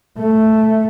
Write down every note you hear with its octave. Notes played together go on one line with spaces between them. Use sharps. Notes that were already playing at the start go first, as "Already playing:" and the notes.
A3